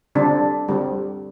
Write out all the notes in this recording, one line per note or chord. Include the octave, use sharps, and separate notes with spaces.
D3 G3 C4 D4
D3 G3 C4